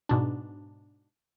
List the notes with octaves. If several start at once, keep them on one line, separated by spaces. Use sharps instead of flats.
G#2 B2 D4